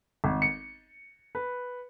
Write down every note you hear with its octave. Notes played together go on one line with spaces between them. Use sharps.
G#1
C#7
B4